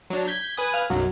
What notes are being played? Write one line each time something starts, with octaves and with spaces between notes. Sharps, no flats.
F#3 D4
G6 G#6 B6
B4 G#5 D#6
F5
B1 F#2 F#3